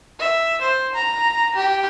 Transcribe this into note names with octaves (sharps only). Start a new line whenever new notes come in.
E5
C5
A#5
G4